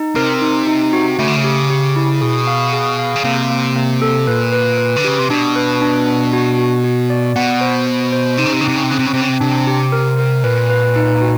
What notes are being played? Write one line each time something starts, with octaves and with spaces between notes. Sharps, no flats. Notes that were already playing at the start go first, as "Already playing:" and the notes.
Already playing: D#4
C3 A#4
D#4
D#4
F#4
C#3 A3
D3
C#3
G4
G4
E4
B2 G#4
F5
G#4
F5
C#3
C3 A#3
A#3
A#3
A4
A#2 B4
B4
B4
D3
C#3 G4
C3
B2 D4
B4
D4
D4
F#4
F#4
F#4
D5
B2 F#5
C5
C5
C5
C3 D#4
C#3
C3
C#3
C3 C4
C#3
C3
C#3 C4
C3
C#3
C3 C4
C#3
C3
C3 D4
G4
A#4
A#4
A#2 B4
B4
D#4
F#4